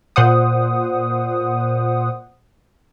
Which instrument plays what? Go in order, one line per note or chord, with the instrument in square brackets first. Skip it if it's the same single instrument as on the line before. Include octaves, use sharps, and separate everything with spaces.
[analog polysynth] A#2 C5 F#5 D#6